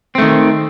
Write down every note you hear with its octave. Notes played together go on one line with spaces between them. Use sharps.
D#3 A3 C4